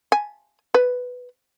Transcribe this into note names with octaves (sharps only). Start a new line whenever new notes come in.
G#5
B4